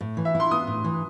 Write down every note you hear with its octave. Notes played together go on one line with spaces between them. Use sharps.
A2
E3
E5
E4
C6
B3 D#6
A2
E3